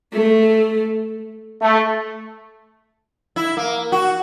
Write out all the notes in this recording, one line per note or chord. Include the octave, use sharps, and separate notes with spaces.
A3
A3
E4
A#3
F#4